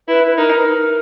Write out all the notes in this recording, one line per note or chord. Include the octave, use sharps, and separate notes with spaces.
E4 B4
B4
D#4 A#4